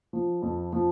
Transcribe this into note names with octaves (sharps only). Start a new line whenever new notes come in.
F3
F2
F3